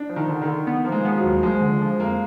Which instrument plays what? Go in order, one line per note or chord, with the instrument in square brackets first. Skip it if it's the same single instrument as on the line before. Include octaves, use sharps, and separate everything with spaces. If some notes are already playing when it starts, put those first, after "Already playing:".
Already playing: [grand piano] D4
[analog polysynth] F3
[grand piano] D#3
[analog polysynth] D3
[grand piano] D#3
[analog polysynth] D3
B3
[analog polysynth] F3 [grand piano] A#3
[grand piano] G#3
[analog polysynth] B3
[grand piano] F3
F#3
[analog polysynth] D#2
[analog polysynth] F3 [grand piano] G#3
[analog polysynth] D3
F3
[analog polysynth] F2 [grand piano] A#3